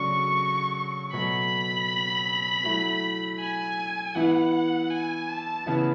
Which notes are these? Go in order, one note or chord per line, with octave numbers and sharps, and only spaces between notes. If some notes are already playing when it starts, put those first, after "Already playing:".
Already playing: C#3 F#3 A3 D4 C#6
B2 F#3 A3 B5
F#3 A3 E4
G#5
E3 B3 E4 F#5
G#5
A5
C#3 E3 B3 E4